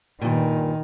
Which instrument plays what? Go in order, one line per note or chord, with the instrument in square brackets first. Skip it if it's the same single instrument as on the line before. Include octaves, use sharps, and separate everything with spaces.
[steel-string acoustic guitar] G2 A#2 [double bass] D#3